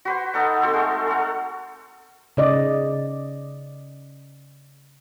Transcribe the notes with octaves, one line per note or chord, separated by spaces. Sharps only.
F#4 B4 C5
D#4 A4 F#5
C4 F#4 A4 C5
G#3 A3 A4
A4 F#5
C#3 D5 D#5